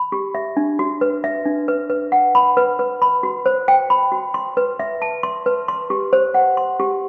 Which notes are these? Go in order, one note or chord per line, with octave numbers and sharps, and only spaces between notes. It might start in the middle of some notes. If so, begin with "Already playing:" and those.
Already playing: B5
G4
E5
D4
F#4
B4
E5
D4
B4
B4
F#5
B5
B4
B4
B5
F#4
C5
G5
B5
F#4
C6
B4
E5
A5
C6
B4
C6
G4
C5
F#5
C6
G4